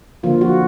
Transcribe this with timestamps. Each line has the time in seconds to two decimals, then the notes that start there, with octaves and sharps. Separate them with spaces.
0.23 D3 F3 A#3 F4
0.41 F#4